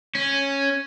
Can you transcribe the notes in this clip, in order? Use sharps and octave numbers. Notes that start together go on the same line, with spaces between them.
C#4